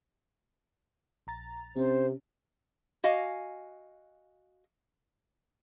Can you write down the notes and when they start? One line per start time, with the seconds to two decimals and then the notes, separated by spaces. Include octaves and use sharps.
1.27 A#1 A#5 A6
1.76 C3 C4 C#4 C5
3.04 F#4 D#5 F5 G#5